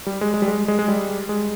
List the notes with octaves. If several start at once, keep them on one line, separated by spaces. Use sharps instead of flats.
G3
G#3
G#3
G3
G#3
G#3
G#3
G3
G#3